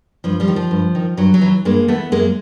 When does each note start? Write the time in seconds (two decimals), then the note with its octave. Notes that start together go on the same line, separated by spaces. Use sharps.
0.24 G2 F3
0.40 F3 G3
0.48 D#3
0.56 F3
0.71 G2
0.95 D#3
1.17 G2 F#3
1.34 F#3
1.41 E3
1.65 G2 G#3 A#3
1.88 E3 A3 B3
2.12 F#2 G#3 A#3